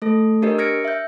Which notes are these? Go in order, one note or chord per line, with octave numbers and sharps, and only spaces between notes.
A3 A4
D4 G4 A#4 C#5 D#5
F6 G#6 A#6 C#7 D7
E5 G6